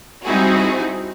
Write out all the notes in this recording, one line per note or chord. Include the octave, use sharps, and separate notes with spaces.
G3 C4 D#4 E4 F#4 G#4